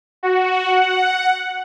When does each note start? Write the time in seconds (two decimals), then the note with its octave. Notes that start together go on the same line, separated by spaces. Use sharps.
0.23 F#4
0.67 F#5